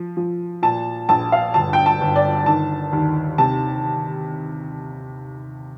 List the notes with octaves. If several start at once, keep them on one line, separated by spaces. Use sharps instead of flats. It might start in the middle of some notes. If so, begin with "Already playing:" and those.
Already playing: F3
F3
A#2 A5
A#1 A5
F5
G1 A5
G5
A5
G1
D5
D#3 A5
D#2
C3 A5